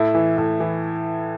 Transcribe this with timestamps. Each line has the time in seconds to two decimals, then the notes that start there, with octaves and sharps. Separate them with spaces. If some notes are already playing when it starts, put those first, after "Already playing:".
Already playing: A2 E4
0.15 E3
0.38 A2
0.60 E3